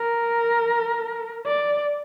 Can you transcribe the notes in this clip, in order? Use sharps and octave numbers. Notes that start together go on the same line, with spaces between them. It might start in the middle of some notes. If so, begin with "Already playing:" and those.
Already playing: A#4
D5